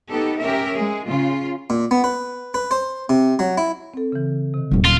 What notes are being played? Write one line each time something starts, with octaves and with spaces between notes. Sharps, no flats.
B3 D#4 G4 A4
C#4 G4 A#4 E5
G#3 G#4
C#3 F4
A#2
B3
B4
B4
C5
C3
F#3
E4
C4 A4
C#3 E3
C3 D#3
D#1 F#3
F4